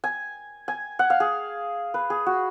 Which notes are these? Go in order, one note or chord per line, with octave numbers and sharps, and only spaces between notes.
G#5
G#5
F#5
F5
G#4
B4
G#4
F#4